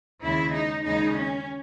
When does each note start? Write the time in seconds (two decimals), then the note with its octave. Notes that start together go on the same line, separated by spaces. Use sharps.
0.23 D#2 C#3 G#3 E4
0.54 D#4
0.85 D#2 C#3 G#3 D#4
1.16 C#4